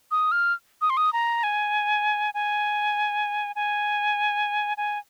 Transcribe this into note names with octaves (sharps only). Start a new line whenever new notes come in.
D#6
F6
D#6
C6
D#6
A#5
G#5
G#5
G#5
G#5